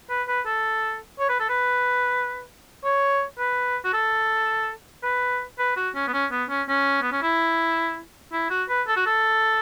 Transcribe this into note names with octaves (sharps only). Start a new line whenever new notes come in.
B4
B4
A4
C#5
B4
A4
B4
C#5
B4
F#4
A4
B4
B4
F#4
C#4
B3
C#4
B3
C#4
C#4
B3
C#4
E4
E4
F#4
B4
A4
F#4
A4